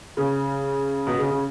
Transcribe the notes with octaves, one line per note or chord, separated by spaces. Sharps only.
C#3
B2
C#3
C#3